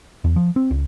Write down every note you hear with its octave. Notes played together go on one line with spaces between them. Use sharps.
E2
F3
C4
C#2